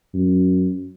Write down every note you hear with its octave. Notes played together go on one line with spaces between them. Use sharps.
F#2